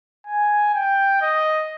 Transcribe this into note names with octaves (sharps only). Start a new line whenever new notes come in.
G#5
G5
D#5